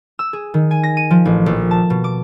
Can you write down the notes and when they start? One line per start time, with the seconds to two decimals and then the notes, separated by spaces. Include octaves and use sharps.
0.19 E6
0.33 G#4
0.54 D#3
0.71 G#5
0.83 A#6
0.97 D#7
1.11 F3
1.25 A1
1.46 A#1
1.71 A5
1.90 B2
2.04 D6